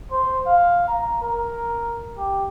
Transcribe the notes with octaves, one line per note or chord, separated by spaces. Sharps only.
C5
F5
A#5
A#4
G4